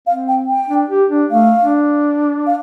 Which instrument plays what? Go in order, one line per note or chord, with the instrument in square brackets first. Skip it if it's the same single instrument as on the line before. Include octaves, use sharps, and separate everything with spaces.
[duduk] C4 [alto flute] F5
[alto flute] G5
G5
[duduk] D4
G4
D4
[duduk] A3 [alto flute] F5
[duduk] D4
[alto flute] F5